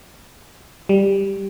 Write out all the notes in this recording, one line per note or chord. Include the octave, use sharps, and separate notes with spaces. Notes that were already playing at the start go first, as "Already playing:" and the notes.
G3